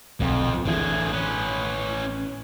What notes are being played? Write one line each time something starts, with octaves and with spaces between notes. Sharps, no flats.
D1 B1 F2
A1 D3 E3 G#4
C#4 B4